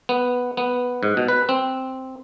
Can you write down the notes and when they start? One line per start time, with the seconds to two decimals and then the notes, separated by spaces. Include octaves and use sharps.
0.09 B3
0.57 B3
1.03 G#2
1.17 B2
1.28 B4
1.49 C4